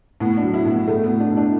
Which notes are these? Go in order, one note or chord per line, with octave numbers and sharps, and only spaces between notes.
A2 B3
D4
F#3
E4
A2 B3
A2 A3
B3
A2
D4
A2
D4